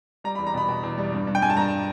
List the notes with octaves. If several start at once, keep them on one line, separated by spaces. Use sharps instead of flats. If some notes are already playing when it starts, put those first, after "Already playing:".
G3 A#5
B5
E2
A#5
B2 B5
B2
E2
G3
G2
G2
G5
G2 G#5
A5
G2 A#5